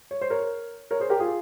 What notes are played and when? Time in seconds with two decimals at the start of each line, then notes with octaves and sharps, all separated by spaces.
0.11 C#5
0.21 C5
0.30 A#4 C#5
0.91 A#4 C#5
1.00 G#4 C5
1.10 G4 A#4
1.20 F4 G#4